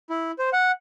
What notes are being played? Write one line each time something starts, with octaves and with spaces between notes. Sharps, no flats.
E4
C5
F#5